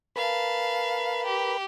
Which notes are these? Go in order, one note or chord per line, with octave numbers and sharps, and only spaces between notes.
A#4 B4 F5 A5 B5
G4